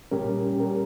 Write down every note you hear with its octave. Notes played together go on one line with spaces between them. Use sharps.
A#2 G3 C#4 G4 A#4
A#2 G3 C#4 G4 A#4